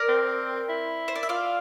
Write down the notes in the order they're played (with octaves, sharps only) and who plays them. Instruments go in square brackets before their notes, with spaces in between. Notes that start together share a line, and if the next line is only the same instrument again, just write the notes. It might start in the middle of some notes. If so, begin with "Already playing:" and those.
Already playing: [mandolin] A#4 D5
[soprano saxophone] C4
E4
[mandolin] C5
D5
E5
[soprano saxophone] F4 [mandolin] D5 F5